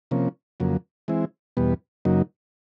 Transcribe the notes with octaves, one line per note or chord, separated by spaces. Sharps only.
C3 F3 A#3 C#4
F2 C#3 F#3 A#3
E3 G#3 C4 E4
E2 B2 G3 B3
F#2 C#3 F#3 A#3 D#4